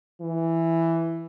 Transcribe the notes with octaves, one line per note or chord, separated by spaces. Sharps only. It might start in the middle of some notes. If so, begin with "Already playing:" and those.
E3